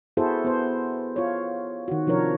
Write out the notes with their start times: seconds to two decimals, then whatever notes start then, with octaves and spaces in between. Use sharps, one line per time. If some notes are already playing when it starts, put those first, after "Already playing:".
0.17 B3 E4 F#4 G#4 A4 C5
0.45 B3 C5
1.16 F4 C#5
1.88 D#3 F#4
2.07 C3 F3 D4 A#4 C#5